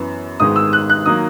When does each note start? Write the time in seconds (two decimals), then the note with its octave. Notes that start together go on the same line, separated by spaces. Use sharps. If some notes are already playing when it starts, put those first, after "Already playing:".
Already playing: F#2 E3 B3
0.40 G#1 G#2 D#3 G#3 B3 D#6
0.56 E6
0.73 F#6
0.89 F#6
1.06 D#3 F#3 A#3 D#6